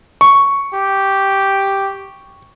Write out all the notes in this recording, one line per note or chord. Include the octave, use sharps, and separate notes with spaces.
C#6
G4